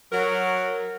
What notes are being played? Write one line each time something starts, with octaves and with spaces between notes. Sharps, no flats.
F#3 A#4